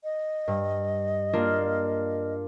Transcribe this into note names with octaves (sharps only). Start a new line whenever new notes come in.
D#5
G2
A#3 D4 F4